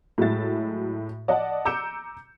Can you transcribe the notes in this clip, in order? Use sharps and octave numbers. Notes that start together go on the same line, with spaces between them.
A2 F#3 G#3 F#4 E5 A6
D5 D#5 F#5 A5
A#5 D6 E6 G6 C#7 E7